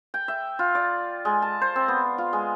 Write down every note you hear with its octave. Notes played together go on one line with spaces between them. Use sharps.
G5
E5
F4
D5
G#3
A5
C5
C4
B3
F4
G#3